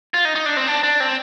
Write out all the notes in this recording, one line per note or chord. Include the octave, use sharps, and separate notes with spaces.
F4
D#4
D#4
D4
C4
D4
D4
C4